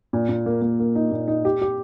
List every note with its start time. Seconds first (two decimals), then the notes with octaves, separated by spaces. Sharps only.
0.13 A#2
0.29 A#2
0.46 A#3
0.62 A#3
0.79 A#3
0.96 D#4
1.11 A#2
1.28 D#4
1.45 G4
1.62 G4